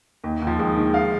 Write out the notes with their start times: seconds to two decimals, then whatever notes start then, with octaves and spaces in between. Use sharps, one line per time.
0.24 D#2
0.42 D#2
0.47 F3
0.59 D#2 G#3
0.76 D#3
0.94 F5